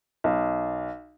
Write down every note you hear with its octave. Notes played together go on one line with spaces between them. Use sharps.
B1